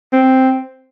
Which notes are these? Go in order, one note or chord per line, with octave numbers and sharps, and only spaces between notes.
C4